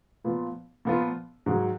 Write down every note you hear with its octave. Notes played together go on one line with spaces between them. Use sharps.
A#2 F3 B3 F4
A#2 F3 B3 F4
G#2 D#3 F#3